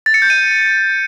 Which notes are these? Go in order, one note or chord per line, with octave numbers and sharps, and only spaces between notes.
A6
C#7
G6
D#7